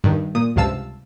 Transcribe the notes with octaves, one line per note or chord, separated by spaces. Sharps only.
G2 D#3
A#2 D#6
C#2 G2 C3 F5 A5 E6